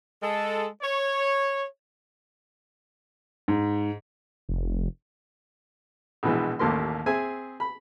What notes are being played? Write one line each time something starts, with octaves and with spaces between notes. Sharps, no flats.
G#3 A4
C#5
G#2
F1
A#1 B2 E3 G#3
A1 D#2 A3 A#3 C6
C4 G#4 E5 G#5
B5